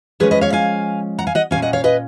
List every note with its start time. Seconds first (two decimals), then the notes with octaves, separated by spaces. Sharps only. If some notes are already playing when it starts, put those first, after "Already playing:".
0.20 F3 G#3 C#4 G#4 B4
0.31 B4 D#5
0.41 C#5 F5
0.53 F5 G#5
1.18 F#5 A#5
1.27 F5 G#5
1.35 D#5 F#5
1.51 A#2 F#3 C#4 F5 G#5
1.62 D#5 F#5
1.73 C#5 F5
1.84 B4 D#5